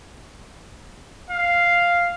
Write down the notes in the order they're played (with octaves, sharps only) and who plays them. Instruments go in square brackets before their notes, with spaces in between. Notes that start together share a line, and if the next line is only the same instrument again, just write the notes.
[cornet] F5